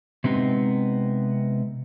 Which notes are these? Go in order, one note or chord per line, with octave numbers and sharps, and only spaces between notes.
C3 G#3 B3 C4 D#4